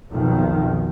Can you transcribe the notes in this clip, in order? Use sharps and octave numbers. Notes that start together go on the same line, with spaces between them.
B1 F2 B2 D#3